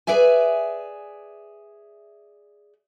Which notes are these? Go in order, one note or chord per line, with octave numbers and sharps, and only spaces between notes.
G#4 B4 D5 E5 G#5